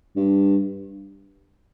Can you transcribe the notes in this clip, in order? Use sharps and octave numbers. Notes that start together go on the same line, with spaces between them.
G2